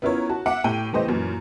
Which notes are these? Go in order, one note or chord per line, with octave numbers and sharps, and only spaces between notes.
B3 C#4 E4 F4 A#4 C#5
F#4 A5
E5 F#5 D6
A2 G4 G5 D#7
E3 A3 B3 G4 C5 D#5
F#2 A#2 E3